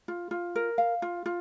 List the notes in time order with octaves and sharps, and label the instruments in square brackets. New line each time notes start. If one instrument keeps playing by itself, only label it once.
[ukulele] F4
F4
A#4
F5
F4
F4